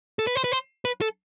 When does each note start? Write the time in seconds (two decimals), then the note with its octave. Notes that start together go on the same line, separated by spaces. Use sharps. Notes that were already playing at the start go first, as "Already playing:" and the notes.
0.19 A4
0.27 B4
0.35 C5
0.44 B4
0.52 C5
0.85 B4
1.01 A4